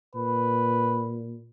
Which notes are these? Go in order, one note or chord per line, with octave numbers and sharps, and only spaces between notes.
A#2 B4